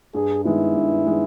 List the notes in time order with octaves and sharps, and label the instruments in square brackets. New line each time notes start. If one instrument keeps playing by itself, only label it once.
[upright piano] G2 [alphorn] G#4
[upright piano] D#3 G#3 B3 [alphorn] E4
[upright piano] G2
D#3 G#3 B3